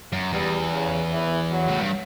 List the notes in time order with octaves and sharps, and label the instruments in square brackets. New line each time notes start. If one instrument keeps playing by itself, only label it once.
[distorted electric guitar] F#2
[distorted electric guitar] E2 [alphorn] G3
[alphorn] C#3
E3
F#3
[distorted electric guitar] A2
G2